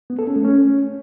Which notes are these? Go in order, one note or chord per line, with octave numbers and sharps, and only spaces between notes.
B3
A4
C#4
A3
C#4